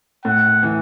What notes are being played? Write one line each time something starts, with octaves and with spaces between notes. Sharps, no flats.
A2 F#5
E3